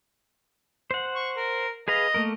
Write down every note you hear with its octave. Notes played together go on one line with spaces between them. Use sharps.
C5 F#5
C#6
A#4
G#4 B4 D#5 F5
A3 A#3 A#4